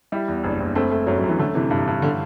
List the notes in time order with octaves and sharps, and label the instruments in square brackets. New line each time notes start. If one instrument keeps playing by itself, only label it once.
[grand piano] G3 [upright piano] E4
[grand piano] E2
[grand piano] F#1 [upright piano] D4
[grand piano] F#1
[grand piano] A3 [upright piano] C4
[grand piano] A3
[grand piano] F#2 [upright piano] F#3
[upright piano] F#3
[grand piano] F#2
[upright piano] E3
[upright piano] D3 [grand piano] A3
[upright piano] C3 [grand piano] E3
[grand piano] G2 [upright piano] C3
[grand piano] G2
[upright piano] D3